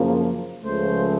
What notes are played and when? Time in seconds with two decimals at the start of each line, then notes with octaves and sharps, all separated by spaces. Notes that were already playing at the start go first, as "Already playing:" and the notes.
Already playing: F#2 C#3 F3 A#3
0.65 C#2 C#3 F3 A3 C5